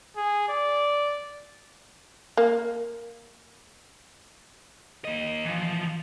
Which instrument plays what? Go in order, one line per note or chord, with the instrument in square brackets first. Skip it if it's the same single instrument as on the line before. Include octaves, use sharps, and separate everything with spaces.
[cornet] G#4
D5
[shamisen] A#3
[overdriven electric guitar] A#3 D#5
E3 F3